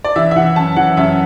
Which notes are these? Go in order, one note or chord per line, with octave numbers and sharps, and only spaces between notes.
D5
E3 E5
E5
E3 F#5
F#2 A5
E3 F#5
F#2 E5